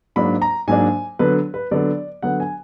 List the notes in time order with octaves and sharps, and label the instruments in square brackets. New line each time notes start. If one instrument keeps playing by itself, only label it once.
[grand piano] G#2 F#3 A#3 D4 B5
A#5
G#2 F#3 A#3 D4 G#5
D3 F#3 B3 B4
B4
D3 F#3 B3 D5
D3 F#3 B3 F#5
G#5